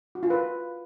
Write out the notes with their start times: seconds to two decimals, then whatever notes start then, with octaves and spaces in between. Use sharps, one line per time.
0.15 F#4
0.23 F4
0.30 B4